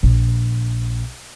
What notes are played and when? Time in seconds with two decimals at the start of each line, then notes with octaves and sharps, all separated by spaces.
0.03 A#1